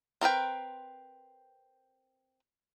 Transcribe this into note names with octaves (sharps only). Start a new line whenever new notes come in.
C4 A#4 B4 G5